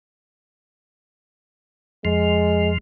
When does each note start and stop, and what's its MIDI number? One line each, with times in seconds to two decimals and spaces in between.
2.05 2.78 41
2.05 2.78 53
2.05 2.71 56